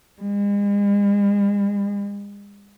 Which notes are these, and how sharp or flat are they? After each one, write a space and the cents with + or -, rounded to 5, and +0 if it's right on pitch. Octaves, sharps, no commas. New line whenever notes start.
G#3 -45